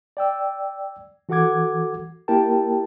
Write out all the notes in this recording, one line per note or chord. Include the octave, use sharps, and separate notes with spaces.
D5 G5 E6
E3 F#4 A4 F#5 D6 G#6
A#3 E4 G4 A#4 G5 A5